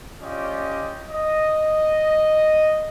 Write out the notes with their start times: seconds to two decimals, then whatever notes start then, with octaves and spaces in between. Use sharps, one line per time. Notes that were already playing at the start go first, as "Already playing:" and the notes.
0.20 C#4 F4 G4 D5 D#5
1.11 D#5